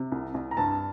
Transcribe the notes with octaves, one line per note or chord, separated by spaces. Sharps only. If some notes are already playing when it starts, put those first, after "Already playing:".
Already playing: C3
C2
C2
A#5
G2 A5